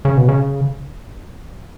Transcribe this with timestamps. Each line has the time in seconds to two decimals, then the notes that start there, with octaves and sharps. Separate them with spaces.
0.05 C#3
0.17 B2
0.29 C#3